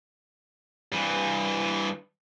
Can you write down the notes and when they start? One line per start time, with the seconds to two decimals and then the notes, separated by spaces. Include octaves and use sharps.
0.92 G2 E3